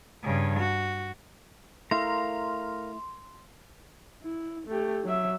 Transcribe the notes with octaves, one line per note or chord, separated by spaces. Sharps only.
G2 C#3
F#4
A3 E4 A#4 F5 A#5 C6
E4
A3 G4
F#3 E5